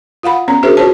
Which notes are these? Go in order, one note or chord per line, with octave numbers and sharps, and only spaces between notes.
F4 F5 F#5 B5
B3 C#4 A#5
D4 F#4 G#4 A#4 C5 E5
F4 F#4 C5 C#5 A5